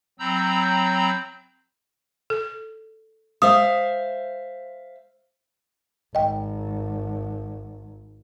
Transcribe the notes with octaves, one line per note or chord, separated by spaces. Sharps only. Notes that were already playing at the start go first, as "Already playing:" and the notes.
F#3 C4 A#5 B5 E6 G6
A4
G#3 C5 E5 F5 D#6
G#1 D#5 G5